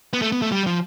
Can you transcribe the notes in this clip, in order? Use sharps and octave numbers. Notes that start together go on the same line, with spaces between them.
B3
A3
B3
A3
G3
F3